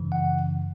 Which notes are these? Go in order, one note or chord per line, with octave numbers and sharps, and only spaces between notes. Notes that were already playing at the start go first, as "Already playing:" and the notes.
Already playing: F#2 C#3 E3
F#5